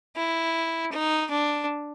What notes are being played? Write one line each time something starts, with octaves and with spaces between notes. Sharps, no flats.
E4
D#4
D4